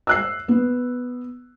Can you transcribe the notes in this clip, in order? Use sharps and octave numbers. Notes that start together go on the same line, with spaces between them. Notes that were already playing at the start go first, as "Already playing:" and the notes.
E6 F#6 C7
B3